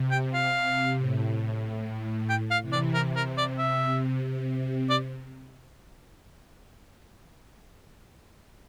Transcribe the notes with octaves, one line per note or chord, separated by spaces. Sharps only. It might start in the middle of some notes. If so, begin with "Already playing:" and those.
Already playing: C3
G5
F5
A2
G5
F5
C3 E3
D5
C3 A#4
A#4
D5
E5
C3
D5